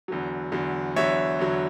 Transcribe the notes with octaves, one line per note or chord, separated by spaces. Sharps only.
E2 D3 F#3
E2 D3 F#3
E2 D3 F#3 C#5 E5
E2 D3 F#3